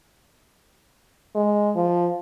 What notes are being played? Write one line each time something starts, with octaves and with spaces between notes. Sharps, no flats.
G#3
F3